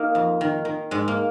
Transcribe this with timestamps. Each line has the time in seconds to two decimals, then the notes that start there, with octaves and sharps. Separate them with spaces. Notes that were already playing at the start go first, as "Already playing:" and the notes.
Already playing: A#3 D#4
0.15 F2
0.41 D#3
0.65 D#3
0.91 G#2 G#3
1.08 A#3